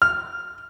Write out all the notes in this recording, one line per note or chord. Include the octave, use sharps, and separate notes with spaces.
F6